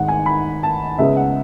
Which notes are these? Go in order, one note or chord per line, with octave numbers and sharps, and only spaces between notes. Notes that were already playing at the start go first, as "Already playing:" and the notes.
Already playing: G#1 G#2 G#3 F#5
G#5
B5
A5
C#2 C#3 G#3 B3 E5
F#5